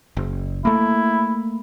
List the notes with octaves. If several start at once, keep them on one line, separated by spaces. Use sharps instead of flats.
F#1
A3 A#3 E4